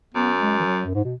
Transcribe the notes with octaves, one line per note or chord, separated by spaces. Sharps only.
F#2 B3
G#3
E3
F#3
F#2
G#2
B2